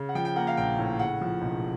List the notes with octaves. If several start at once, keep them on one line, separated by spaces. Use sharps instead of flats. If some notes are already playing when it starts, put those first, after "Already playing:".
Already playing: C#3
F#5
F3 G5
G5
A#3 F#5
F5
A#1 G5
A2
C#3 F#5
F3
E1